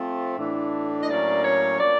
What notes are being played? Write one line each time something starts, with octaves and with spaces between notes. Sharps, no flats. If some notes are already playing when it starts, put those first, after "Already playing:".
Already playing: F3 A3 C4
A2 E3 A3 D4
D#5
A2 F#3 A#3 C#4 D5
C#5
F3 A#3 D4 D5